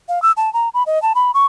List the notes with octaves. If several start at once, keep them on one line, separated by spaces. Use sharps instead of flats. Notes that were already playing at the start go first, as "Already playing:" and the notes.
F5
E6
A5
A#5
B5
D#5
A5
B5
C#6